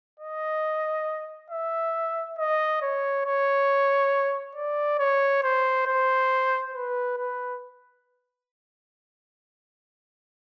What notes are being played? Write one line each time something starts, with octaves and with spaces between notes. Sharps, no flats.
D#5
E5
D#5
C#5
C#5
D5
C#5
C5
C5
B4
B4